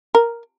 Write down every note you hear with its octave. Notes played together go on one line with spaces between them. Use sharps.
A#4